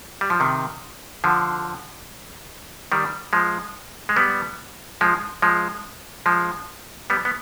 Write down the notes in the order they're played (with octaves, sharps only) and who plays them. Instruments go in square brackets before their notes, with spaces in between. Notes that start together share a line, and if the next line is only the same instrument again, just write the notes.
[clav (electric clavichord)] G3
F3
C3 D#3
D3 F3
D#3 G3
F3 G#3
G#3
G3 B3
F3 G#3
F3 G#3
F3 G#3
G3 B3
B3